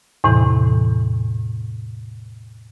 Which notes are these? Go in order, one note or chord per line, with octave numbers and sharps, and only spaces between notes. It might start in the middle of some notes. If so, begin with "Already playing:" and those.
E2 A2 C3 E3